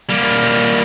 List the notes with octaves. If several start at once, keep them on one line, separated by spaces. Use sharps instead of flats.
G3 A#3